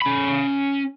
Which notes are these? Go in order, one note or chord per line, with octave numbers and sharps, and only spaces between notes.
C#4 B5